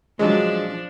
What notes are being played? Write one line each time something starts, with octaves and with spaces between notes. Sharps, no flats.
F3 F#3 G#3 D4